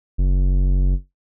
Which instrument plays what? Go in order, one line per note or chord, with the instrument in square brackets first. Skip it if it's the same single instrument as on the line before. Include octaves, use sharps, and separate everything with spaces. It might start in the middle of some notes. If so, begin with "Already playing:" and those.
[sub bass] F#1